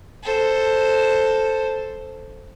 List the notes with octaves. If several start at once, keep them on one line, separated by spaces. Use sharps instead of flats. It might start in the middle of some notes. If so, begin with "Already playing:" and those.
A4 C5